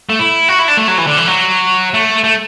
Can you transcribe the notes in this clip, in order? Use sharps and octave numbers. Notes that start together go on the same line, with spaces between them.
A3
E4
F#4
E4
D4
A3
F#3
E3
D3
E3
F#3
A3
A3